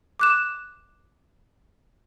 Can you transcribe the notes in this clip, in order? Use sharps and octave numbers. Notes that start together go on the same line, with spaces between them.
D6 F#6 E7